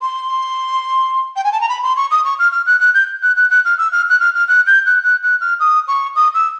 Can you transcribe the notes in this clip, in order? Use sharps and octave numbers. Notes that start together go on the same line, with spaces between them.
C6
G5
G#5
A5
A#5
B5
C6
C#6
D#6
C#6
F6
F6
F#6
F#6
G6
F#6
F#6
F#6
F6
E6
F6
F#6
F6
F6
F#6
G6
F#6
F#6
F#6
F6
D#6
C#6
D#6
E6